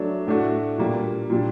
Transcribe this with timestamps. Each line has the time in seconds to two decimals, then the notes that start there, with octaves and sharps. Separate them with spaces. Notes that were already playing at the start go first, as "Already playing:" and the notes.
Already playing: F#3 A3 D4
0.27 A2 A3 D4 F#4
0.78 A#2 G3 A#3 D4
1.30 A#2 G3 D4